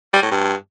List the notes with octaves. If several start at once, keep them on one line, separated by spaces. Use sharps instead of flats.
G3
A2
G2